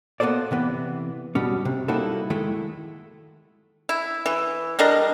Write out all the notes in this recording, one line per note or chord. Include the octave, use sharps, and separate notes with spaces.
A#3 B3 C#4 A4 C5 D5
C3 E3 B3
B2 G3 C#4
C3
G3 A#3 D#4 E4 F#4 A4
D#3 G#3 A3 E4
E4
E3
G3 D4 A#4 D#5